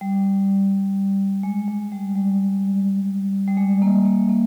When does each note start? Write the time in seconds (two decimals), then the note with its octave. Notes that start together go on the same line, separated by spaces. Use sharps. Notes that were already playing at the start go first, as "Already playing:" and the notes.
0.01 G3
1.43 G#3
1.68 G#3
1.92 G3
2.15 G3
3.48 G3
3.57 G#3
3.82 A#3
4.06 G#3
4.29 A#3